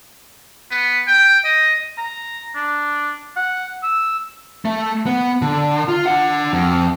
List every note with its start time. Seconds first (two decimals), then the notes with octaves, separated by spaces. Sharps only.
0.71 B3
1.07 G5
1.44 D#5
1.98 A#5
2.55 D4
3.36 F#5
3.83 E6
4.65 A3
5.06 B3
5.42 D3
5.89 F4
6.06 D4 F#5
6.53 F2